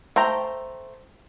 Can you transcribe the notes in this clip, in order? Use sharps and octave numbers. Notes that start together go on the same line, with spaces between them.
A3 C5 G5 A#5